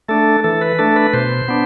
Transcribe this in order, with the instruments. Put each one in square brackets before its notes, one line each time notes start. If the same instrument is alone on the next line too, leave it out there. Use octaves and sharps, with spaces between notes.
[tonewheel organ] A3 D4 A4
E3 A4
B4
A3 D4 A4
B4
B2 C5
B3 D4